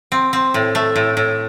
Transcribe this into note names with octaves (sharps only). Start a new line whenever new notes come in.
C4
C4
A2
A3
A2
A2